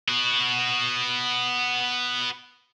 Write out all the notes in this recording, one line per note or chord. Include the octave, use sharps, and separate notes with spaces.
B3 F#4